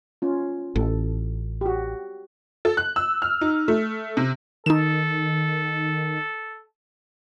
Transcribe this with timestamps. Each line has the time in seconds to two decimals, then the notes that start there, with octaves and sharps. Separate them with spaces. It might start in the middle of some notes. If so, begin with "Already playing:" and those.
0.22 C#4 F4
0.76 A1 A4
1.61 F#4 G4
2.65 A4
2.77 F#6
2.96 E6
3.22 F6
3.41 D#4
3.68 A3
4.17 C3
4.66 D#3 D#4 A4 E7